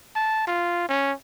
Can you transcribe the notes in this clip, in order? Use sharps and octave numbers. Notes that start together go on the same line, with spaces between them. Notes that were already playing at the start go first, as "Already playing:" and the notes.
A5
F4
C#4